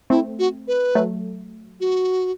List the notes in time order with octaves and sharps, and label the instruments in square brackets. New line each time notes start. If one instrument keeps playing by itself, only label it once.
[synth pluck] A3 C4 [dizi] E4
[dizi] F#4
B4
[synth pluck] F#3 A3
[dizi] F#4